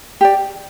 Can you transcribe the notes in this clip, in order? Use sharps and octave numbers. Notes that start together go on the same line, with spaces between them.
G4 D5